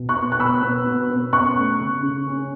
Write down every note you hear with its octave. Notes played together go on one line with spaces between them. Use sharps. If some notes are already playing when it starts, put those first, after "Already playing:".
Already playing: B2
C#6 F#6
B3
F#6
B2 B5 E6
B3
B2
B3
C#4 C#6 F#6
A3
C#3
C#3
C#4